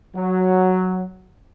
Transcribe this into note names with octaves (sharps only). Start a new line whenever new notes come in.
F#3